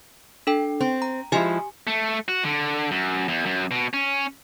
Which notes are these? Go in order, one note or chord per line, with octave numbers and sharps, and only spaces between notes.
D4 A4 G5
C4
A#5
F3 G#3 E4 G4 G#5
A3
F#4
D3
F#2
E2
F#2
B2
C#4